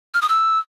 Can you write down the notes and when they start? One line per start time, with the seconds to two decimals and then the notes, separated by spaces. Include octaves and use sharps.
0.14 F6
0.22 D#6
0.29 E6